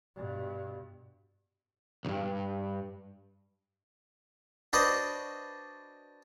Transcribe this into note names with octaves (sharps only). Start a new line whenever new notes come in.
G2 B2
B1 G2
D4 F#4 B4 C5 D5 D#5